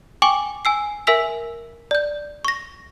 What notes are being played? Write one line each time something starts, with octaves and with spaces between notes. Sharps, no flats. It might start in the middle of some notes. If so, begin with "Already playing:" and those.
G5 G#5 C#6 D6 F#7
G#5 E6 C7
A#4 E5 G#5 E6 B6 F7
D5 G6
C#6 A#6